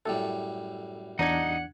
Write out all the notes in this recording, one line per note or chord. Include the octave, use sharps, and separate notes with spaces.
F#2 A2 G3 A4
E2 D4 D#4 F#5 G#6